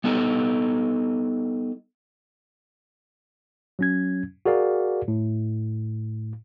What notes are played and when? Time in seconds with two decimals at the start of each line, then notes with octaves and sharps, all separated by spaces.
0.04 G3 B3 D#4 A4
3.79 F#3 C#4 G#6
4.46 F#4 G#4 A#4 D5 F5
5.08 A2